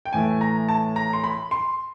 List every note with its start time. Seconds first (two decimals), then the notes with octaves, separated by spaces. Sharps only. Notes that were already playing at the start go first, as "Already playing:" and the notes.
0.05 G5
0.13 A2 E3 A3 G#5
0.41 A#5
0.69 A5
0.96 A#5
1.13 C6
1.24 B5
1.51 C6